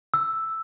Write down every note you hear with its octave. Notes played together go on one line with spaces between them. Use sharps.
E6